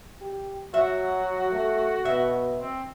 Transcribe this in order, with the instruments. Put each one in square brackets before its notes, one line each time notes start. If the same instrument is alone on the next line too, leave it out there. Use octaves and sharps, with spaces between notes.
[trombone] G4
[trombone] F#3 [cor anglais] F#4 [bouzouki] E5
[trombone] A3
[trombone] B2 [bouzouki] E5
[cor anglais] C4